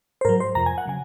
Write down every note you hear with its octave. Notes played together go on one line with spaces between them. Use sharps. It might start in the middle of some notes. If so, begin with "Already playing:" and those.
C5
G#2 F#3 A#4
C5
F2 C3 F3 A#5
G#5
F#5
C#3 F#3 G#5